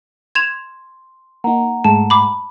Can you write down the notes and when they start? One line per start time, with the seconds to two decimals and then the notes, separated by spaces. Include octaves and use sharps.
0.35 C6 G#6 E7 F7
1.44 A#3 D#4 F#5 A#5
1.84 G#2 G#3 A3 A5
2.10 B5 D6